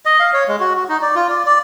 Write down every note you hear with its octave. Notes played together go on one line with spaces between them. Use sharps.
D#5
F5
C#5
G#3
F#4
F#4
D#4
D5
F4
D5
D5